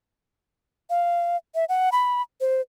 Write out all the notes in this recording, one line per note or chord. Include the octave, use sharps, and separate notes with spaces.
F5
E5
F#5
B5
C5